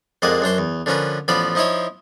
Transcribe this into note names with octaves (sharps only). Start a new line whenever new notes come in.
F2 G#3 A#3 D5 F#5 G#5
F#2 D4 C5 C6
E2
D3 F3 C#4 A#4 B4
A1 F3 B3 D5 F5 B5
F3 D#4 E4 C5 C#5